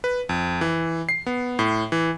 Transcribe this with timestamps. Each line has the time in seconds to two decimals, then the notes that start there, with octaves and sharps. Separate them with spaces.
0.04 B4
0.29 F2
0.61 E3
1.09 C7
1.26 B3
1.59 A2
1.92 E3